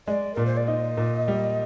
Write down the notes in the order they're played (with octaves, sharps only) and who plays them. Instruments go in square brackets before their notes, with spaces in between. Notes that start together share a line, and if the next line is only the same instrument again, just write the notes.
[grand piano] G#3 [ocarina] D5
[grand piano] A#2 [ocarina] A#4
[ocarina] C5
D5
[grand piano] D#4 [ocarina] D#5
[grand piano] A#2
G3